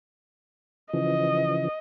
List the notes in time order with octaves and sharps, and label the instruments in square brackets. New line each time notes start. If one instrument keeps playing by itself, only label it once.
[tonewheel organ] C#3 E3 F3 [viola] D#5